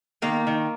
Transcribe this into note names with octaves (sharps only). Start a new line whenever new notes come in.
D#3 A#3
D#3